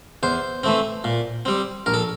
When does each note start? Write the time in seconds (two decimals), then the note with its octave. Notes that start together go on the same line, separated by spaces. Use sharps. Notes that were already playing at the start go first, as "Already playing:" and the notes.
0.23 E2 C5
0.64 E3 A3 C4
1.04 A#2
1.45 G3 C4
1.86 A#1 A#4
1.94 A4